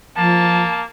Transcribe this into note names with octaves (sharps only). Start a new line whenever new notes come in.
F3 A#3 A5